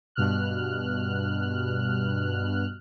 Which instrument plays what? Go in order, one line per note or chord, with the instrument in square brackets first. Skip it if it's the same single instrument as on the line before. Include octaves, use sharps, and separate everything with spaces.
[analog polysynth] G2 B2 F6 F#6